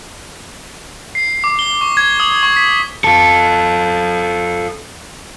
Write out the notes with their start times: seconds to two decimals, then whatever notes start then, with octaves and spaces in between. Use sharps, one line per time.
1.15 C7
1.44 D6
1.59 G7
1.81 C#6
1.97 G#6
2.20 D#6
2.43 C#6
2.56 B6
3.04 F4 A4